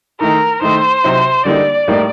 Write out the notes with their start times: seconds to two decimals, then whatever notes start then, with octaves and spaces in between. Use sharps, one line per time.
0.20 D#3 A3 D#4 A#4
0.61 D#3 A3 D#4 C5
1.04 C3 F#3 C4 D#4
1.45 D3 G3 A#3 D#4 D5
1.88 A2 G3 A#3 D#4